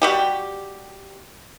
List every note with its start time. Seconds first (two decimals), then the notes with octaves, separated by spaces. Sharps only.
0.02 G3 F#4 G4